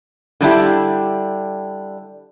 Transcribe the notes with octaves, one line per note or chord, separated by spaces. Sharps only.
D3 G3 D4 E4 G4